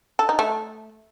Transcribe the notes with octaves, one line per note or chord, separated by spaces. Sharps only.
A4
D#4
A3